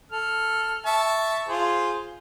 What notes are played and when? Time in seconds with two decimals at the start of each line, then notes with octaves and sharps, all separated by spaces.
0.12 A4 F6
0.86 E5 A5 C#6
1.48 F4 G#4 C5